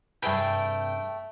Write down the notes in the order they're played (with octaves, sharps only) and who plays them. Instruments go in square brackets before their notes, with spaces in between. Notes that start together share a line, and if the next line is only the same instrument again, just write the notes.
[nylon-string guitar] G2 C3 [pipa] A3 G#4 B4 [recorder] G5